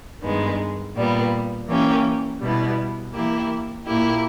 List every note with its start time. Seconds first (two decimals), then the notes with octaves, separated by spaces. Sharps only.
0.22 G2 D#3 G#3 B3
0.95 A#2 G3 B3
1.68 E3 A#3 C#4 G4
2.41 B2 G3 B3 E4
3.13 E3 A#3 E4 G4
3.86 A#2 A#3 E4 G4